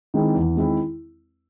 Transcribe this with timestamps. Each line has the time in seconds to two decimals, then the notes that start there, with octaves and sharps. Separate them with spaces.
0.14 D#3 G#3 C4 E4
0.35 E2
0.56 D#3 G#3 C4 E4